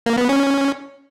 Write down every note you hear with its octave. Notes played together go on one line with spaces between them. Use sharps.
A#3
B3
C#4